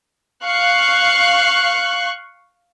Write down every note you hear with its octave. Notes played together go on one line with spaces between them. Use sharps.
F5 C#6 F#6